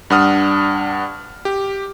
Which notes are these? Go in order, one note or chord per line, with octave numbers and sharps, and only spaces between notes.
G2 D4 F#5 D#6 F6
G4